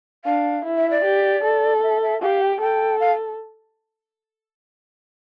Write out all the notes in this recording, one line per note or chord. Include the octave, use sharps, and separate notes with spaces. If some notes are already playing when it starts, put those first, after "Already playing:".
D4 F5
E4
E5
D5
G4
A4
E5
E5
G4 F5
G5
A4 G5
F5